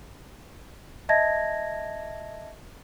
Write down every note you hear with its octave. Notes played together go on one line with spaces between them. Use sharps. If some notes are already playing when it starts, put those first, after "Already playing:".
D#5 E5 A5 G#6 A#6